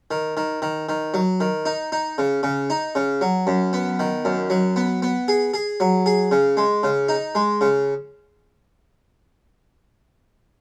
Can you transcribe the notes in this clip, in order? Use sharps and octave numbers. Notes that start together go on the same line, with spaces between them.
D#3
D#3
D#3
D#3
F#3
D#3
D#4
D#4
C#3
C#3
D#4
C#3
F#3
F#2
B3
D#3
F#2
F#3
B3
B3
G#4
G#4
F#3
G#4
C#3
G#3
C#3
D#4
G#3
C#3